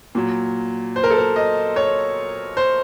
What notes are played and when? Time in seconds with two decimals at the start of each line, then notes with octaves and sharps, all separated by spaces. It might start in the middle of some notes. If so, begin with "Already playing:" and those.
0.15 A#2 F#3
0.96 C5
1.04 A#4
1.11 A4
1.18 A#4
1.36 D#5
1.76 C#5
2.57 C5